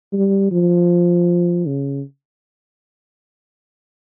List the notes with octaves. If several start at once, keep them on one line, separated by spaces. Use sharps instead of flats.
G3
F3
C#3